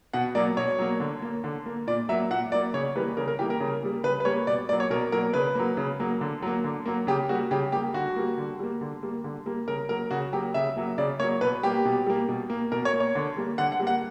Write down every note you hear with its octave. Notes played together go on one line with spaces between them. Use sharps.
B2 F#5
F#3 A#3 D5
B2 C#5
F#3 A#3
D3
A#3
D3
A#3
A#2 D5
F#3 A#3 E5
A#2 F#5
F#3 A#3 D5
C#3 C#5
E3 G3 A#3 B4
C#3 A#4
A#4
E3 G3 A#3 G4
A#4
C#3
G3 A#3
C#3 B4
B4
G3 A#3 C#5
B2 D5
F#3 A#3 D5
C#5
B2 A#4
F#3 A#3 A#4
C#3 B4
F#3 A#3
C#3
F#3 A#3
D3
F#3 A#3
D3
F#3 A#3
C#3 G4
G3 A#3 F#4
C#3 G4
G3 A#3 G4
D3 F#4
G3 A#3
D3
G3 A#3
D3
G3 A#3
D3
G3 A#3
C#3 A#4
F#3 A#3 A#4
C#3 F#4
F#3 A#3 G4
C#3 E5
F#3 A#3
C#3 D5
F#3 A#3 C#5
B2 B4
G3 A#3 G4
B2
G3 A#3
B2
A#3
B2 A#4
C#5
A#3
C#5
D3
G3 A#3
D3 F#5
F#5
G3 A#3
F#5